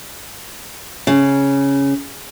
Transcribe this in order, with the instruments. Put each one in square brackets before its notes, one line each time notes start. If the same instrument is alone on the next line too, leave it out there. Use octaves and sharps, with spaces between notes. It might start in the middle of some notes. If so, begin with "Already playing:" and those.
[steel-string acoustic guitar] C#3